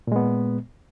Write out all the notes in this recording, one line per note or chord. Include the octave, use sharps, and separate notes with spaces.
A#2 G#3 B3